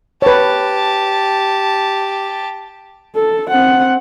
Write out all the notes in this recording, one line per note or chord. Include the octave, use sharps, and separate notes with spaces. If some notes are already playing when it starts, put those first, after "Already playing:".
G4 B4 C#5 A5
A4
C4 F#5